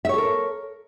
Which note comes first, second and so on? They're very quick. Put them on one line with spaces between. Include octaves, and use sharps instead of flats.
E5 C#5 A4 A#4